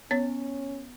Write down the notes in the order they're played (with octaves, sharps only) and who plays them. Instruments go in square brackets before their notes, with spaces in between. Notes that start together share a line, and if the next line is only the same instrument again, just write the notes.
[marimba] B3 C#5 A6 [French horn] C#4